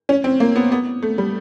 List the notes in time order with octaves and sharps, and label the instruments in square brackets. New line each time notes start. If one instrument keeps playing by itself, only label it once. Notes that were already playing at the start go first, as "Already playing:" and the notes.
[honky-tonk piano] C#4
C4
A#3
B3
B3
A3
G3